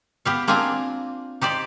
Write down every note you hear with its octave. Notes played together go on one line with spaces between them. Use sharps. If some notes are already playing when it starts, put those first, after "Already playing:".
B3 G4 F5
A#3 C4 D4 F4 G#5 A#5
D#4 G4 C5 D5